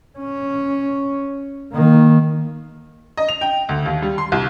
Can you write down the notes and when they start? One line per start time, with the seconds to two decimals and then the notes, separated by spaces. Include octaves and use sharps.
0.19 C#4
1.72 D#3 A#3
3.17 D#5
3.29 F7
3.41 G5
3.69 D2
3.86 D#2
4.02 G3
4.18 C6
4.32 C2